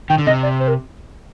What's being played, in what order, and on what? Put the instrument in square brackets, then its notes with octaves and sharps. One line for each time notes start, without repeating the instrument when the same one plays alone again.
[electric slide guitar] D#3 [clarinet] G5
[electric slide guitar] D3
[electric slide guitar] C3 [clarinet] D#5
[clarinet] D5
C5
A#4